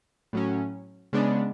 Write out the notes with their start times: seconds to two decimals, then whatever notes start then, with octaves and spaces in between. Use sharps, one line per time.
0.33 A2 F#3 C#4
1.13 C#3 G#3 B3 D4